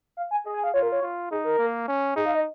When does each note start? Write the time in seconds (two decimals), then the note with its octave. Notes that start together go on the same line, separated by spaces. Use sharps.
0.17 F5
0.31 G#5
0.46 G#4 D#5
0.54 G#5
0.64 F5
0.74 F4 C#5
0.82 A#4
0.92 C#5
1.02 F4
1.30 D#4 G#4
1.44 A#4
1.58 A#3
1.88 C#4
2.15 D#4 G#4
2.26 F5
2.35 D#5